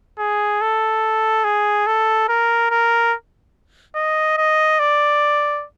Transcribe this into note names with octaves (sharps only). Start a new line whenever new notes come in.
G#4
A4
G#4
A4
A#4
A#4
D#5
D#5
D5